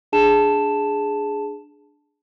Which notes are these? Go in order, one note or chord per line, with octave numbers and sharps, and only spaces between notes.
D4 G#4 A5 E7